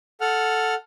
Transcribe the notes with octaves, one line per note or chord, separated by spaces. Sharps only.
A4 F#5 F6